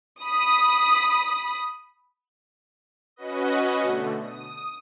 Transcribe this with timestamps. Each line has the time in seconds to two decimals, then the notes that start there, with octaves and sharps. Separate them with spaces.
0.21 B5 D#6
3.16 C#4 F#4 B4 D#5
3.81 B2 D3 A3
4.22 D#6